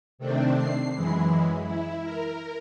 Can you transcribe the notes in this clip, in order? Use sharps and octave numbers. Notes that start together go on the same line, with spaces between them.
C3 D#3 A3 C4 D4
C7
F#2 E3 G#3 E4
E4
A#4